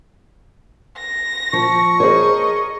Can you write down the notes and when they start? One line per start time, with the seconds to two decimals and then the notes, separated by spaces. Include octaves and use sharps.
0.98 A#6
1.53 F3 C#6
2.00 G#4 A#4 C5 C#5 D#5